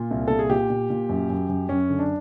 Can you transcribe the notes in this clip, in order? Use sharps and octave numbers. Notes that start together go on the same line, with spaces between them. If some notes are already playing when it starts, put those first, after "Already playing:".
Already playing: A#2 F4
C2
A#2 A4
G#4
A#2 G4
A#2
A#2
F#2
F#2
F#2
F#2 C#4
D3
D4